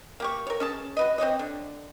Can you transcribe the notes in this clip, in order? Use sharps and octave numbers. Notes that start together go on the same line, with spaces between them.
A#3 G4 C#6
A#4 C#5
C#4 G#4 A5
F#4 B4 D#5
C4 D#4 C#5 D#5
D3